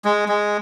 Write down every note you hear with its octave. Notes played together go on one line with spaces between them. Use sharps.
G#3
G#3